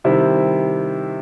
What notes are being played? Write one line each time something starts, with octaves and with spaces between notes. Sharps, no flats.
C3 D#3 G3 C4 E4